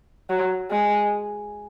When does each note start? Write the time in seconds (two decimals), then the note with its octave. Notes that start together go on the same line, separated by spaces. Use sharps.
0.30 F#3
0.71 G#3